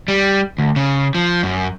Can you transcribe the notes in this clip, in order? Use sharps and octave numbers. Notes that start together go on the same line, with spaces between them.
G3
D2
C#3
F3
F#2